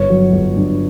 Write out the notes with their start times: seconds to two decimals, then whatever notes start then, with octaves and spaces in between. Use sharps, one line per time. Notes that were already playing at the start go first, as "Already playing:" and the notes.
Already playing: G1 C#5
0.10 F#3
0.33 G1
0.56 G2